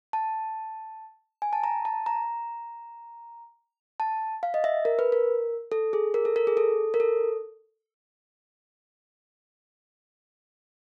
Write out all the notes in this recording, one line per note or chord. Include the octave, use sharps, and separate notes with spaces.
A5
G#5
A5
A#5
A5
A#5
A5
F5
D#5
E5
A#4
B4
A#4
A4
G#4
A#4
A4
A#4
G#4
A4
A#4
A4